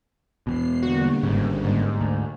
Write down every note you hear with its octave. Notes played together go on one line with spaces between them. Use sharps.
E2 B2 C7
D3 G3 A#3 F#4
G1 G#2 C#3
G#2
D2